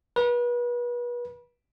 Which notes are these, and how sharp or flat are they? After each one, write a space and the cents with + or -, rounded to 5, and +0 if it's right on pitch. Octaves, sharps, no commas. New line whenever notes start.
B4 -35